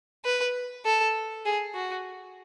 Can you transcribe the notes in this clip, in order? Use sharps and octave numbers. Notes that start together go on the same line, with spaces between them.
B4
A4
G#4
F#4